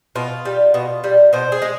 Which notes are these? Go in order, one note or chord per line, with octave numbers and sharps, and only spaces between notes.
B2 F4
G3
B2
G3
B2 C5
G#4
G#3